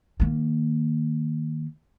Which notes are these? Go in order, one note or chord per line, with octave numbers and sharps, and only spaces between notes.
D#3 A#3